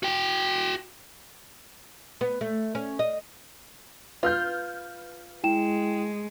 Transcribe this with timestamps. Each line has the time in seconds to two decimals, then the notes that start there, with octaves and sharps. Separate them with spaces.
0.03 F#4 G5
2.21 B3
2.41 A3
2.75 C#4
2.99 D#5
4.23 F4 B4 F6 G6
5.44 G#3 E4 G5 E7